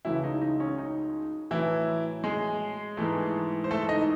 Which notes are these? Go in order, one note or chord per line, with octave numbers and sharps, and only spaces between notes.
C#2 C#3 E3 F#3 A3 E4
D#4
D#4
C#4
D#4
A2 E3 F#3 A3 E4
G#3 G#4
G#2 E3 A3
C5
A3 A4
D#4 D#5